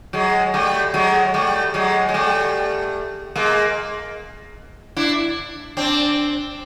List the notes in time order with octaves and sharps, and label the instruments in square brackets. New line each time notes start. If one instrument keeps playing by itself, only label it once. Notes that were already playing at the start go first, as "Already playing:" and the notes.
[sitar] F#3 G#3
G3 A3
F#3 G#3
G3 A3
F#3 G#3
G#3
G3 A3
G#3 A#3
D4 E4
C4 D4